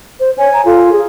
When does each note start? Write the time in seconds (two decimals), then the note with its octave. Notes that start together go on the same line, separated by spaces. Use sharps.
0.20 C5
0.38 C#5 G#5
0.53 A#5
0.65 F4 A4
0.91 G#4